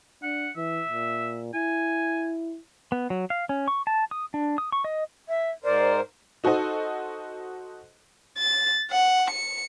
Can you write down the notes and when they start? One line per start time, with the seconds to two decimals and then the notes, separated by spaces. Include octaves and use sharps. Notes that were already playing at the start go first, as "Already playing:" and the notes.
0.23 D4 F#5
0.56 E3 E5
0.88 A#2
1.54 E4 G#5
2.92 B3
3.10 F#3
3.30 F5
3.49 C#4
3.68 C#6
3.87 A5
4.11 D#6
4.34 D4
4.58 D#6
4.72 C#6
4.84 D#5
5.29 E5
5.64 G#2 A#4 C5 D5
6.44 D#4 F#4 A4 C5 D#5
8.38 A6
8.91 F#5
9.31 C#7